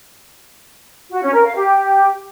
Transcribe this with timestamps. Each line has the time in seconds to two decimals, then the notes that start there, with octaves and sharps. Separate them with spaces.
1.11 F#4
1.22 C#4
1.33 A#4
1.44 F5
1.56 G4